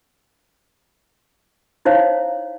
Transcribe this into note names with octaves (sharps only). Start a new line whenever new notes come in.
D#4 E4 C5 C#5 F5